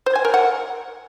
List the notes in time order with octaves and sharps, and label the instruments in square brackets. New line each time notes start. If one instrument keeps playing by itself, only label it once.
[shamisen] C5
G#5
A#4
F#5